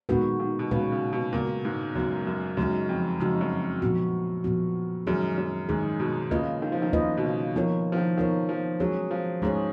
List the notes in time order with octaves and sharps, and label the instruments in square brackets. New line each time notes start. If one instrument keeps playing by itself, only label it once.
[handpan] A#2 G#3 B3 F#4 B4 [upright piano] D#3
[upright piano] D#3
B2
[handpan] A#2 G#3 B3 F#4 B4 [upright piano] C#3
[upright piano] C#3
B2
[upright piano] A#2 [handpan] C#3 G#3 B3 F#4
[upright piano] G#2
[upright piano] F#2 [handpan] C#3 G#3 B3 F#4
[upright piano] F#2
[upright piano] F#2 [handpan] C#3 G#3 D#4 F#4
[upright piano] F2
[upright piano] F2 [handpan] C#3 G#3 D#4 F#4
[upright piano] F#2
[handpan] A#2 F3 B3 F#4
A#2 F3 B3 F#4
[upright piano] F#2 [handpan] D#3 G#3 D#4 G#4
[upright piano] F#2
[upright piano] G#2 [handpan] D#3 G#3 D#4 G#4
[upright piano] B2
[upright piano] C#3 [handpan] A#3 F4 B4 D#5
[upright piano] D#3
F3
D#3
[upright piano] C#3 [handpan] A#3 F4 B4 D#5
[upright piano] B2
C#3
[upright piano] D#3 [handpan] F3 B3 F4 A#4 C#5
[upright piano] F3
D#3
[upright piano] D#3 [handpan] F3 B3 F4 A#4 C#5
[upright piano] F3
[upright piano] F#3 [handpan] G#3 C#4 G#4 C#5
[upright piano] F3
[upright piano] G#2 [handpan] G#3 C#4 G#4 C#5